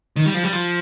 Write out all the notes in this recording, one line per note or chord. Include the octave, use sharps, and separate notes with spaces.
D#3
G3
F3
G3
F3